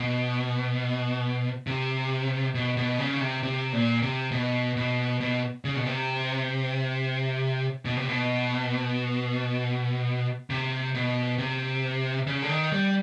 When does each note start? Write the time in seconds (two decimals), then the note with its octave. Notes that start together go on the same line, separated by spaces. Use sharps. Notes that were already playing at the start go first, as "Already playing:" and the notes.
Already playing: B2
1.67 C3
2.55 B2
2.77 B2
2.99 C#3
3.21 C3
3.43 C3
3.73 A#2
4.02 C3
4.31 B2
4.76 B2
5.21 B2
5.65 C#3
5.76 B2
5.86 C3
7.85 B2
7.97 C3
8.09 B2
10.50 C3
10.94 B2
11.38 C3
12.27 C#3
12.42 D3
12.49 D#3
12.72 G3